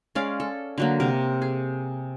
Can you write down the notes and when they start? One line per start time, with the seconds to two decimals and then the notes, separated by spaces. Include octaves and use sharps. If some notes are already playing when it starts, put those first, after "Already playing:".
0.15 G#3 C#4 D5 F5
0.40 A4
0.78 D3 F#3 A#3
1.00 C3 A#4
1.42 G#4